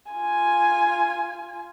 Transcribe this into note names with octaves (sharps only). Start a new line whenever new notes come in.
F4 G#5